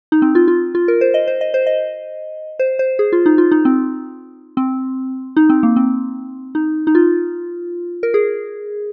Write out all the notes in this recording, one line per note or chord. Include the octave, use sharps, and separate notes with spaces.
D#4
C4
F4
F4
F4
A#4
C5
D#5
C5
D#5
C5
D#5
C5
C5
G#4
F4
D#4
F4
D#4
C4
C4
D#4
C4
A#3
C4
D#4
D#4
F4
A#4
G#4